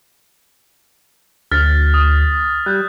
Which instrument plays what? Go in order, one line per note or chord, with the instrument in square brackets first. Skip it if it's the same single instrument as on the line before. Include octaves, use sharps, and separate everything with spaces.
[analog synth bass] D2 [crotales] F6 A6 B6
[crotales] D#6
[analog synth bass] G3 [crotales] F#6 G6